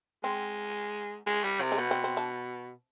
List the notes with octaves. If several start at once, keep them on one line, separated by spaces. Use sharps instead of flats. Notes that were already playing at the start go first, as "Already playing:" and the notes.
G#3 C4
G#3
G3
C3
G#3
B2 B3
C4
C4
D4